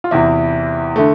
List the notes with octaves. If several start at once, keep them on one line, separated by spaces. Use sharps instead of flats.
F4
E2 C3 E3 E4
D3 A3